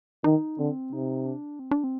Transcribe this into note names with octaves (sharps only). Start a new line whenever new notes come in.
D#3 D#4
D3 C4
C3 D#4
D4
C4
D4
C4